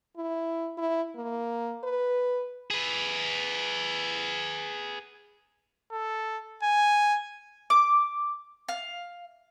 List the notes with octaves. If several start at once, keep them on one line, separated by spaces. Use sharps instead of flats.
E4
E4
A#3
B4
G#4 B4
A4
G#5
D6
F5